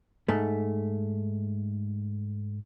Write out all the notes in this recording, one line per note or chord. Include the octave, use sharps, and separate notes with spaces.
G#2 A3